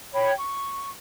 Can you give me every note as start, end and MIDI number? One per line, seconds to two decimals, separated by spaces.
0.12 0.31 73
0.12 0.31 79
0.12 0.31 83
0.37 0.89 85